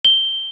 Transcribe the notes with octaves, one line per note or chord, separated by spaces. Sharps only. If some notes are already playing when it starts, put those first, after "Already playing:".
G7